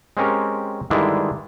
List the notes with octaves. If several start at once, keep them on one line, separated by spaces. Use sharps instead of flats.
G#3 C4 C#4 G4 A#4
G2 D3 D#3 G#3 D4 E4